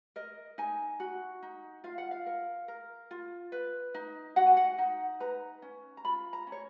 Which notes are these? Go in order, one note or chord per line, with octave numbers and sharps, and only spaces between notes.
A#4 D#5
D#4 G#5
F#4
D#4
F4 F5
F#5
F5
A#4
A#4
F4
B4
D#4
F#4 F#5
G#5
F#5
D#4
B4 A#5
C#4
A#5
F4 B5
A#5
C#4
C#5